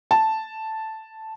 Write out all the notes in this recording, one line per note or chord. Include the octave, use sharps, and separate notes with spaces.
A5